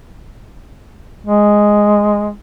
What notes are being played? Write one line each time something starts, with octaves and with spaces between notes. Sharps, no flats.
G#3